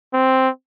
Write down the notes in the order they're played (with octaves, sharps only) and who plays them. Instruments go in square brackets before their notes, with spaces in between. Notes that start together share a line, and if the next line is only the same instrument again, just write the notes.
[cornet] C4